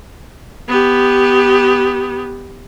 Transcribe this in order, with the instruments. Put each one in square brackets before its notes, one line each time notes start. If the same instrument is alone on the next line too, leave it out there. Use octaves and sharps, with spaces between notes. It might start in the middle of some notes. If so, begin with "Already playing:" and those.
[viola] B3 G4